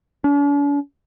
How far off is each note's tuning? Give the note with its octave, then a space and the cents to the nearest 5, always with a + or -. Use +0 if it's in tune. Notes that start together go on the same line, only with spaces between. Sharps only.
D4 -45